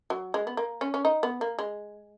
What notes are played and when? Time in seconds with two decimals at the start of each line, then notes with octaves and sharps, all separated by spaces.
0.10 F#3
0.34 G#3
0.47 B3
0.57 A#3
0.81 C#4
0.94 C#4
1.05 D#4
1.23 B3
1.41 A#3
1.59 G#3